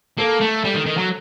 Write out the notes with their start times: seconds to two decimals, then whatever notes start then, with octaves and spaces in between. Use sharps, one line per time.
0.18 A#3 A4
0.41 A3
0.64 G3
0.75 D#3
0.86 D#3
0.98 F#3